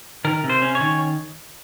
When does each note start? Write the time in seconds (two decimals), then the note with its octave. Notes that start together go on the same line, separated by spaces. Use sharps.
0.25 D#3 A#4
0.44 C3
0.49 C5
0.62 C#4
0.75 C#5
0.81 D#3